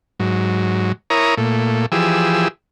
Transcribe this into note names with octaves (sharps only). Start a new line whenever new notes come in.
G#2 F#3
E4 A#4 C#5 A#5 D#6
A#2 A3
E3 F3 G4 G#4 E6